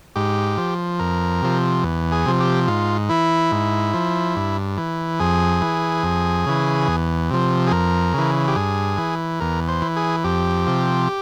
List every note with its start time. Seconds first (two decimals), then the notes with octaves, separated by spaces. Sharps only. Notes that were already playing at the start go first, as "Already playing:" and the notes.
0.16 G#2 G4
0.57 F3
0.99 F2 A#4
1.42 C3 F3
1.83 E2
2.12 G#4
2.26 C3 F3
2.40 G4
2.68 G#2 F4
3.09 E3 E4
3.52 G#2
3.94 F3
4.36 G2
4.78 E3
5.20 F2 G#4
5.62 E3
6.03 F2
6.46 C#3 E3
6.88 E2
7.30 C3 F3
7.67 G#4
7.71 F2 A#4
8.14 C#3 E3
8.47 G4
8.56 G2 G#4
8.98 E3
9.40 E2 A#4
9.68 C5
9.82 E3
9.96 G#4
10.24 F2 G4
10.66 C3 F3